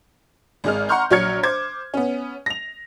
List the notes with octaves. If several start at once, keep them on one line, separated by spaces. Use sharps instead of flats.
G#1 G#3 F6
F#5 A#5 C6 C#6 F6 G6
A#1 F#3 C#5 F6 G#6 C#7
C5 D6 G#6
B3 C#4
A#6 F7